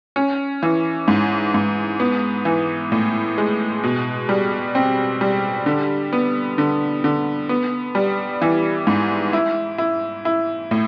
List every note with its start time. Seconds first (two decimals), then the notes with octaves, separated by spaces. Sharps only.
0.16 C#4
0.63 E3
1.08 G#2
1.54 G#2
2.00 B3
2.45 E3
2.92 A2
3.38 G#3
3.83 B2
4.29 G3
4.75 C4
5.21 G3
5.66 D3
6.13 B3
6.58 D3
7.04 D3
7.49 B3
7.95 G3
8.42 E3
8.87 G#2
9.33 E4
9.78 E4
10.25 E4
10.71 A2